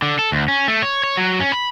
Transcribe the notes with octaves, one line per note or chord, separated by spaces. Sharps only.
D3
A4
D2
C#4
A3
C#5
C#5
F#3
C#4
B5